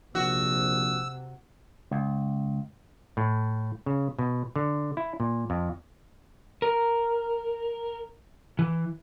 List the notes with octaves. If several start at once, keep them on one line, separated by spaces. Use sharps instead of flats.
A#1 C3 F#4 E6
C#2
A2
C#3
B2
D3
E4
A#2
F2
A#4
E3